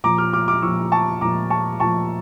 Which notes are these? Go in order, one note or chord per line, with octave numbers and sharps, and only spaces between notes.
A#2 F3 A#5 D6
D6 F6
D6 F6
D6 F6
A#2 F3 C#6 E6
A5 C#6
A#2 F3 A#5 D6
A5 C#6
A#2 F3 A5 C#6